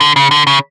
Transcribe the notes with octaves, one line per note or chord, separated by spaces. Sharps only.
D3
C#3
D3
C#3